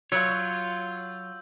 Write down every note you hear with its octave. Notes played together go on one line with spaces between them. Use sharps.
F#3 F4 C#5 E6 G6